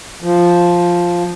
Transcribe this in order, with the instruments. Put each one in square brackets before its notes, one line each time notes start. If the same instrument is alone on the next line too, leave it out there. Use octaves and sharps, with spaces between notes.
[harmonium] F3